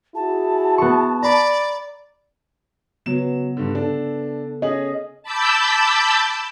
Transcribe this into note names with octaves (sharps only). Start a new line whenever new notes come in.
E4 F#4 G#4 A5
B3 C#6
D5 A#5 B5
C#3 F#3 B3 E7
G2 D3
D4 A4
C#4 G#4 D#5 F#7
A5 B5 D6 E6 G6